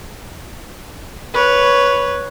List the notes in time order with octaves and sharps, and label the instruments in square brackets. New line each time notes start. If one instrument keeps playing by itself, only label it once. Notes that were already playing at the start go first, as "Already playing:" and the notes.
[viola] B4 C#5